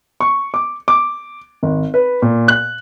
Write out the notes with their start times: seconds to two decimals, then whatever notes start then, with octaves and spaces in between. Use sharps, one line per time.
0.20 C#6
0.54 D6
0.88 D6
1.63 G#1
1.94 B4
2.22 A#2
2.48 F#6